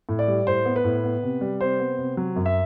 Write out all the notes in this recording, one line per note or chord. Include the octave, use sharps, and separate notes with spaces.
A2
D5
G3
A2 C5
B3
B4
A2
B3
C3
G3
C3 C5
B3
C3
F#3
F#2
E5